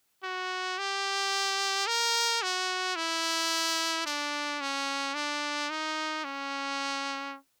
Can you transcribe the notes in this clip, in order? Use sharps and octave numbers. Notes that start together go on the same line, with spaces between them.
F#4
G4
A#4
F#4
E4
D4
C#4
D4
D#4
C#4